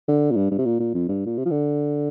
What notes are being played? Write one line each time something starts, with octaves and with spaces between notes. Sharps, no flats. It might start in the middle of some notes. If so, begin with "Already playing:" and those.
D3
A#2
G2
G2
C3
A#2
A#2
F2
G2
A#2
C3
F3
D3